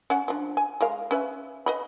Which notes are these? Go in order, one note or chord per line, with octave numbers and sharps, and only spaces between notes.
C#4 F#5
F3 D4
G#5
G#3 A#4 F5
C#4 B4 E5
B4 D#5 B5